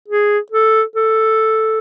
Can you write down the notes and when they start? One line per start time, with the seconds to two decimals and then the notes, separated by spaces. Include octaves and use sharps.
0.08 G#4
0.52 A4
0.96 A4